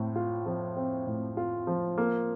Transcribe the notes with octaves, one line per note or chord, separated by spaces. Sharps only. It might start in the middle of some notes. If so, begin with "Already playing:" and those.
Already playing: A2 C4
F4
F3
C4
A2
F4
F3
A#3